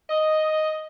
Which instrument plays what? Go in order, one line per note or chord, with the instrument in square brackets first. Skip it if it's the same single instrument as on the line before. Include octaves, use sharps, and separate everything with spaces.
[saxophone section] D#5